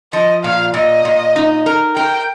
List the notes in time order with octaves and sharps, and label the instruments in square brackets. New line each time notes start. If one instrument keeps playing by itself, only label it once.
[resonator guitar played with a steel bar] F3 [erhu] D#5
[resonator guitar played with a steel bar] A#2 [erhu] F5
[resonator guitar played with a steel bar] A#2 [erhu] D#5
[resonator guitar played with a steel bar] A#2
D#4
A#4
[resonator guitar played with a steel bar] A#4 [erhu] G5